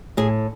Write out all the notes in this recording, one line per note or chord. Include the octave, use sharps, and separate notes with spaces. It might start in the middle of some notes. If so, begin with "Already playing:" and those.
A2 G#4